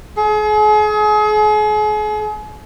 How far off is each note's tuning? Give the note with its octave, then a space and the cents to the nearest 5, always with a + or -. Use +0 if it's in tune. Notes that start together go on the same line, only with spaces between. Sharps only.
G#4 +35